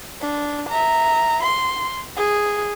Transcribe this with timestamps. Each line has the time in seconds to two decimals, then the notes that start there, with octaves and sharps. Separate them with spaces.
0.21 D4
0.69 E5 A#5
1.43 C6
2.17 G#4